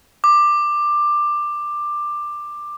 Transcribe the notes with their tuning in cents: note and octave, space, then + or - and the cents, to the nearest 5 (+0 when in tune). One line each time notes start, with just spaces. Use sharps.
D6 +15